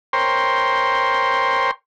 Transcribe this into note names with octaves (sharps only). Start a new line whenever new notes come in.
A#4 C5 C#5 G5 C6